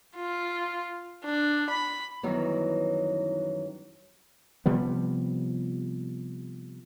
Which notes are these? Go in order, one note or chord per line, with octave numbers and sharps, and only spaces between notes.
F4
D4
B5
F#2 D#3 E3 F#3 G3 B3
C3 F3 G3 B3